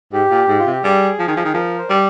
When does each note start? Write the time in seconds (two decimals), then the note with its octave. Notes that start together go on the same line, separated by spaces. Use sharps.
0.12 G#2 G4
0.30 A#2
0.48 G#2
0.59 F4
0.66 C3
0.71 G4
0.83 G3 G#4
1.19 F3
1.28 D#3
1.37 F3
1.45 D#3
1.54 F3 A#4
1.78 C5
1.89 G3 D5